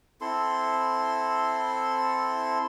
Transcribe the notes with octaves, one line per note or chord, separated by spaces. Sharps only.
C4 E4 A4 C6